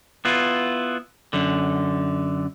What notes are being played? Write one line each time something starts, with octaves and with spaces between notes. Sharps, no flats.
B3 E4 F4
F#2 D3